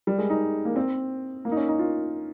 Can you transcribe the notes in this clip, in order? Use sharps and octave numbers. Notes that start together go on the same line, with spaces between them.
G3
G#3
D#4
A#3
C4
A#3
D#4
C#4
D#4
F4